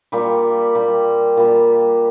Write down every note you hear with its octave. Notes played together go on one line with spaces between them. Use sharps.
A#2 G3
A#2 G3
A#2 G3